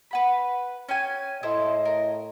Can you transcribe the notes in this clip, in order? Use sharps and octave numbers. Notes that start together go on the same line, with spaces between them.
B4 F#5 B5
C#4 G5 G#5
A2 E4 A4 C5 D#5
A#4